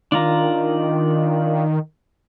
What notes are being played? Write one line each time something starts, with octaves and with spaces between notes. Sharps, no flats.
D#3 D4 F4 A#5